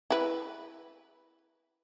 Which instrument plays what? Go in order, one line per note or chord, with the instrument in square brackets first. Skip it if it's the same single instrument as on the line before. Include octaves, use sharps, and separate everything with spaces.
[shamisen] E4 B4